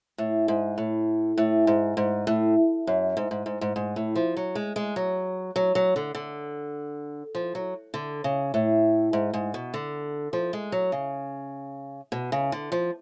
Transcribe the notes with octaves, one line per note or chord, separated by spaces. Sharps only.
A2
G#2
A2
A2
G#2
G#2
A2
F#2
G#2
G#2
G#2
G#2
G#2
A2
F3
F#3
G#3
G#3
F#3
F#3
F#3
D3
D3
F3
F#3
D3
C#3
A2
G#2
G#2
B2
D3
F3
G#3
F#3
C#3
B2
C#3
D3
F3